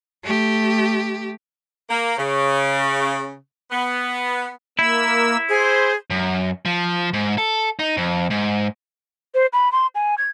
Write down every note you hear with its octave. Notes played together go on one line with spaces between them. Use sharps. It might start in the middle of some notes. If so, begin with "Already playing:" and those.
A3 G4
A#3
C#3
B3
A#3 E4 E6
G#4 C5
F#2
F3
G#2
A4
D#4
F2
G#2
C5
B5
C6
G#5
G#6